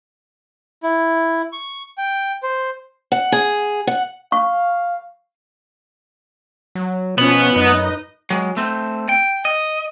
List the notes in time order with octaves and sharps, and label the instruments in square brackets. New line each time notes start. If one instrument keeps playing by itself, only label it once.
[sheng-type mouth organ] E4
C#6
G5
C5
[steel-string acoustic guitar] F#5
G#4
F#5
[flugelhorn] F5 [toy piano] C#6
[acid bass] F#3
[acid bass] B2 [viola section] F3 C#4 [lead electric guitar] B3
[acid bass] F#2 [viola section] D#4 B4 D#5
[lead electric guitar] F#3 G#3
A3 C4
G5
D#5